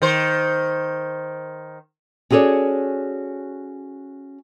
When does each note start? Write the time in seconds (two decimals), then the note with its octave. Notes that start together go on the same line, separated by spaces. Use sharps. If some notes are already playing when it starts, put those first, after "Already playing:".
0.02 D#3 C5
2.30 C#4 F#4 G#4 A4 C#5 D5